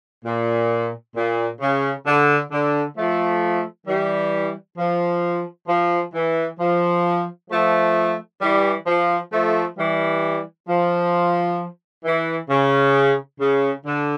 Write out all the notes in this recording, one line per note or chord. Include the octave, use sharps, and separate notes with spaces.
A#2
A#2
C#3
D3
D3
F3 A3
E3 G3
F3
F3
E3
F3
F3 A3
E3 G3
F3
F3 A3
E3 G3
F3
E3
C#3
C#3
D3